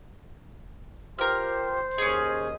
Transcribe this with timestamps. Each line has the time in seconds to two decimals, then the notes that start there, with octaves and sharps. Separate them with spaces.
1.18 F4 G4 A#4 C5 F6
1.98 D#2 C#4 G#4 D#5 D#6